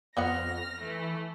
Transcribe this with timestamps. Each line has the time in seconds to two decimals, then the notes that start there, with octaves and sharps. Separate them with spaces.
0.17 F2 B3 C4 F#5 F6 A#6
0.81 E3 A3